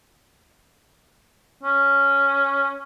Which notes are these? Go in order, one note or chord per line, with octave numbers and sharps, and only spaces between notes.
C#4